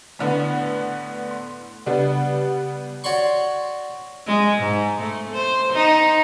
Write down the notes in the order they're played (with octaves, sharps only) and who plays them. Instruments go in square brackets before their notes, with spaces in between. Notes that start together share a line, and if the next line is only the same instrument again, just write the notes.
[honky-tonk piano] A2 D3 B3
[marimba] C6
[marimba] C#3 [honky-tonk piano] G3 B3 D4
[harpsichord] F#4 C#5 D5 C6 C#6
[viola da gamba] G#3
G#2
A3
C5
D#4